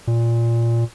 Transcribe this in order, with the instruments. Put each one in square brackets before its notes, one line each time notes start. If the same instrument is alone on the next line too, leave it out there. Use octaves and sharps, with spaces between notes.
[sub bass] A#2